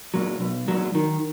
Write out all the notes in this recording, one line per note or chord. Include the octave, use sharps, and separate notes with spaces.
A#2 F#3
B1
A#2 F#3
D#3